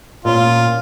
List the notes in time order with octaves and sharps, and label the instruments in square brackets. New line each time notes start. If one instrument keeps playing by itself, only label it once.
[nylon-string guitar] A#2 C#4 [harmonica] F4